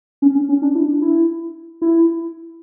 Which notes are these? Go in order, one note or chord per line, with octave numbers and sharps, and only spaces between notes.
C#4
C#4
C#4
D4
E4
D4
E4
E4